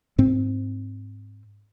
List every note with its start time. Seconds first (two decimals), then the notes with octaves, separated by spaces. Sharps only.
0.18 G#2 C4